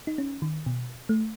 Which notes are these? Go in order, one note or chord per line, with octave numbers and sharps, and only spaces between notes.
D#4
C#4
D#3
B2
A3